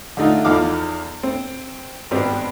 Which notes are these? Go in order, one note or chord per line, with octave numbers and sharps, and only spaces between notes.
D3 A3 D#4 F4
E2 F3 D#4 A4 F5 D6
C4
G#1 G2 B3 C4 G4 B5